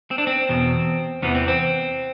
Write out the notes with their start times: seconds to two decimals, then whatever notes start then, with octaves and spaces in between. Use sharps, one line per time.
0.11 C4
0.18 D4
0.27 C4
0.49 E2 B2
1.22 E2 C3 E3 B3
1.35 C4
1.48 C4